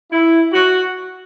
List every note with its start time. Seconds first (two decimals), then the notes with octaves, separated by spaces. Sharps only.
0.11 E4
0.53 F#4